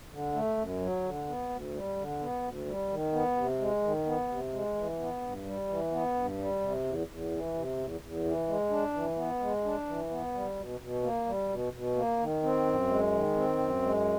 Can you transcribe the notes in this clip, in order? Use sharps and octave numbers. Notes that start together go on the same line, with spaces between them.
D3
A3
F#2
F#3
D3
B3
D2
G3
D3
B3
D2
G3
D#3
B3
C3
G#3
D#3
B3
C3
G#3
E3
B3
G2
G3
E3
B3
G2
G3
C3
E2
E2
E3
C3
E2
E2
E3
G#3
D4
E3
B3
G#3
D4
E3
B3
G3
B2
B2
A#3
G3
B2
B2
A#3
D#3
C4
F#2
G#3
D#3
C4
F#2
G#3